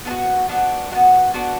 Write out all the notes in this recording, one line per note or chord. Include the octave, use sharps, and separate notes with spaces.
B3 D4
F#4
B3 D4 F#4
B3 D4 F#4
B3 D4 F#4